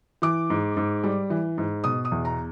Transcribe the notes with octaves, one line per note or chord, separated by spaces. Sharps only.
E3 D6
G#2
G#2
G3
E3
G#2
B2 D#6
D#6
E2
A#5